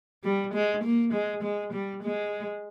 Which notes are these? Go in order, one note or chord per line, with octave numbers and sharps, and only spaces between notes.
G3
G#3
A#3
G#3
G#3
G3
G#3